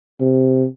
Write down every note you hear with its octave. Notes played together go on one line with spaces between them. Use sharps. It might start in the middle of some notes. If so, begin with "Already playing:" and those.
C3